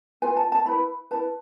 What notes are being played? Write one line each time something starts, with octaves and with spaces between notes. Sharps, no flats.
F4 B4 G#5
A5
A5
E4 B4 B5
E4 B4 A5